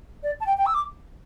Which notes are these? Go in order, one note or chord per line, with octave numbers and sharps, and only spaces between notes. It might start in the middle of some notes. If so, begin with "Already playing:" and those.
D5
A5
G5
G5
E6
D6